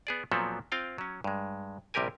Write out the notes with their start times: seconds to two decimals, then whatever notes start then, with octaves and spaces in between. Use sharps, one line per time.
0.07 B3 G#4 D5
0.32 A#2 F3 F#3 B3 C4 A4
0.72 C4 F4 F5 G5
0.98 F#3 C#4
1.24 G2 G#3
1.94 A#1 C3 G3 G4 A#4 G#5